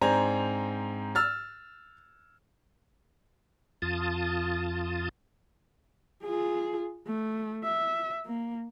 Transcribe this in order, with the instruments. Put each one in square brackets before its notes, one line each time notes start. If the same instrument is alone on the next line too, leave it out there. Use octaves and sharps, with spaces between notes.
[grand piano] G#2 C4 D4 C5 G#5 A#5
E6 F6 A6
[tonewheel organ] F2 F4 A5 D#6
[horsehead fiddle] F4 G#4
A3
E5
A#3